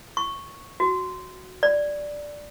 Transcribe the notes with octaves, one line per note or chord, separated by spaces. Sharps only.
C#6
F#4
D5